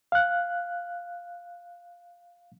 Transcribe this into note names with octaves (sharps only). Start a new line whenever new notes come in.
F5 F#6